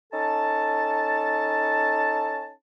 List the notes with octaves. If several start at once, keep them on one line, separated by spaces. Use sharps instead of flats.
C#4 D#4 A4 A5